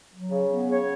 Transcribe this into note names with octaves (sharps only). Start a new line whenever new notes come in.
F#3
C#3
B3
C#3 C#5